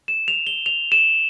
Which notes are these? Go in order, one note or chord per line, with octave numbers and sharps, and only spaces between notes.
E7
F7
G7
F7
E7